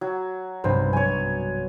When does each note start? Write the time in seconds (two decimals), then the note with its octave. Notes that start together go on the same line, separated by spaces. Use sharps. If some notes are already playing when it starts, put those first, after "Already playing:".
0.01 F#3
0.64 B1 G2 C3 C5
0.93 F#3 C#5 G#5